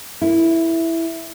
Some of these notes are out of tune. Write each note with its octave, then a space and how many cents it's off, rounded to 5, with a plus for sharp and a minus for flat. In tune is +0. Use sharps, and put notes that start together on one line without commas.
E4 +0 A#4 +0